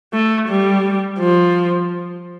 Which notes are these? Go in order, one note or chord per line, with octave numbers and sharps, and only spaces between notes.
A3
G3
F3